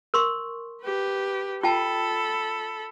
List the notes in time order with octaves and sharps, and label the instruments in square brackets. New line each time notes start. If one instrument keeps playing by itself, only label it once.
[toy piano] A#4 C6 C#6
[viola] G4 B4
[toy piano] F4 G5 A5 [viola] A4 B5